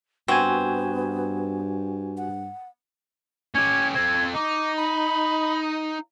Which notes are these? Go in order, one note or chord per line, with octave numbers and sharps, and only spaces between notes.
G2 B3 C4 F#4 G#5
F#5
C#4 G4 G#6
C4 A4 G#6
D#4 D6
B5